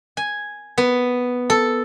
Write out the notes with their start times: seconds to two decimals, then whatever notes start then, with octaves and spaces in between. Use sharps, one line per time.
0.17 G#5
0.78 B3
1.50 A4